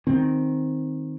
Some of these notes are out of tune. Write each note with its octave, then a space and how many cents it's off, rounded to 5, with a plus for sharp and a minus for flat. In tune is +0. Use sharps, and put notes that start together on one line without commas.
D#3 +0 C4 +0